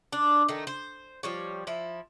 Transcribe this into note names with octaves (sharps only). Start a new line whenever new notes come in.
D4
D#3 A3 D#4
C5
F3 G3 C#5
F3 E4